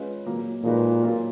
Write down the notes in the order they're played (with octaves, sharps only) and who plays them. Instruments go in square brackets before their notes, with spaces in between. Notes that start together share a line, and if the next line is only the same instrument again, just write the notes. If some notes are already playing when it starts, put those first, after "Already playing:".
Already playing: [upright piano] G#3 C#4 F4 B4 D#5
A#2 F#3 A#3
[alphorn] A#2 [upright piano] F3 G#3 D#4 F#4 B4
[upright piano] F#3 A#3 F4 A#4